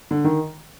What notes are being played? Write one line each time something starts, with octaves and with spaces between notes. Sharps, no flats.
D3
D#3